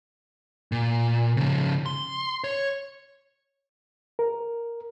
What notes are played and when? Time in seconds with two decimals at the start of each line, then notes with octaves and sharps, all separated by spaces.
0.72 A#2
1.37 C#3 F3
1.86 C6
2.44 C#5
4.19 A#4